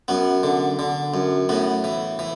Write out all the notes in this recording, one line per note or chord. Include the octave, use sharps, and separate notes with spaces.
F#2 B3
D3
D3
F#2
A2 B3
E3
E3